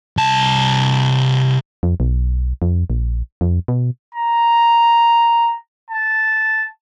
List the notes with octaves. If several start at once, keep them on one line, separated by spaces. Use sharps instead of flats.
C2 A5
F2
B1
F2
A#1
F2
B2
A#5
A5